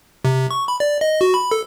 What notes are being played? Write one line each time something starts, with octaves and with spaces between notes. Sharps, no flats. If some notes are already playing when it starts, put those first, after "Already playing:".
C3
C#6
B5
D5
D#5
F#4
B5
A4